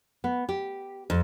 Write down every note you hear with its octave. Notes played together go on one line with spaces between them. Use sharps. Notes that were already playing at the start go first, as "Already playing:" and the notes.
B3
G4
F2